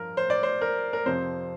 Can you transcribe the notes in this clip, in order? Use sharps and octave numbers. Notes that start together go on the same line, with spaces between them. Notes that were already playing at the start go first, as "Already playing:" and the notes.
Already playing: G2 F3 A#4
C5
D5
C5
A#4
A#4
F2 C3 F3 C4 C5